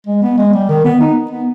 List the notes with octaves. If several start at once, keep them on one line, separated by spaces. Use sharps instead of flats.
G#3
B3
G#3
G3
D#3
B3
D#4
B3